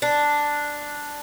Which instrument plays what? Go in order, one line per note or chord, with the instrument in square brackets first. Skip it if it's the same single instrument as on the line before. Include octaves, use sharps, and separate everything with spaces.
[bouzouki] D4